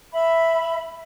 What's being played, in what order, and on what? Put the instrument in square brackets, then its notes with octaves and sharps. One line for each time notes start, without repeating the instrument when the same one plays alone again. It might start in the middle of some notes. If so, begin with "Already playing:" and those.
[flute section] E5 B5